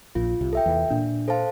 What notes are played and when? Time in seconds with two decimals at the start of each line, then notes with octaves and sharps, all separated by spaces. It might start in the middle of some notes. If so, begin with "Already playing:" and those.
0.15 A#1 A#2 F4
0.41 C2 C3
0.53 A4 E5 G5
0.66 E2 E3
0.90 A#2 A#3 D4
1.28 A4 C5 F5 A5